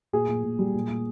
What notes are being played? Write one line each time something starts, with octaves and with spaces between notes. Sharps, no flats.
A#2 G#4
A#2
A#2
G3
A#2
A#2